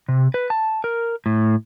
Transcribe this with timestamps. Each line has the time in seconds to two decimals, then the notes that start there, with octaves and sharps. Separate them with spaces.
0.09 C3
0.34 B4
0.50 A5
0.84 A#4
1.26 A2